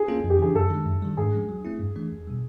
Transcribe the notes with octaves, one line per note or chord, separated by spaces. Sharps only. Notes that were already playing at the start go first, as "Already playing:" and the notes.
Already playing: G#4
A#3 C#4 F4 A4
F2
G4
C#3 E3 G#4
F#2 A4
D#3 G#3
F#2
D#3 G3
G#2 G#4
F3 G#3 C#4
F#3
A3 C4 E4
G2
E3 A3 D4
E2
B2 G3